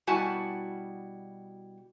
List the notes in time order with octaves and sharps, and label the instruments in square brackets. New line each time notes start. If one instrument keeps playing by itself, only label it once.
[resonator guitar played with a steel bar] B2 G3 E4 F#4 G#5 A5